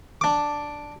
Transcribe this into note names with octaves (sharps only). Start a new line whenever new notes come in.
D4 D6